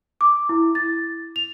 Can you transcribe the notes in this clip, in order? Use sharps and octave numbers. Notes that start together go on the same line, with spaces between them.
D6
E4
A6
F7